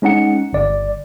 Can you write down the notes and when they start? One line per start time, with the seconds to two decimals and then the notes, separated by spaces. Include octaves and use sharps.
0.02 G#3 C#4 D#4 F#5 C#7
0.53 G1 D5